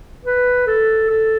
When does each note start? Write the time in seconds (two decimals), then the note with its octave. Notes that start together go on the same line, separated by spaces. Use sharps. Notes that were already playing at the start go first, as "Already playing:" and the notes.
0.25 B4
0.67 A4
1.10 A4